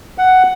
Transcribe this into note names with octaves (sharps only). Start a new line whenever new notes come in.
F#5